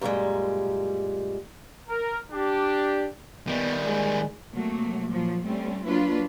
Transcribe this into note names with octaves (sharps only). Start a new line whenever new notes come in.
F#2 A#2 D#3 G3 G#3
A#4
D4 G4
D#3 G3 B3
G#3
C3 F#3 A3 A#3
A#2 F3 F#3
G3 A3 C4 C#4
F#3 A#3 D4 F4 B4